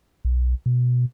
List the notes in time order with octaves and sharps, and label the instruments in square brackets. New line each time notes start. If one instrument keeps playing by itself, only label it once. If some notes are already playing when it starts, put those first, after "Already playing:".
[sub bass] B1
B2